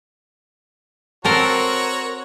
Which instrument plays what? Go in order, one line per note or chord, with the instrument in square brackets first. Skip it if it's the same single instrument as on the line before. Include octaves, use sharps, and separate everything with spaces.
[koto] C4 A4 A#4 [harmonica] F#4 C#5 A#5